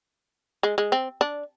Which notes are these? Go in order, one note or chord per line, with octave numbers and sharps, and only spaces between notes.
G#3
G#3
C4
D4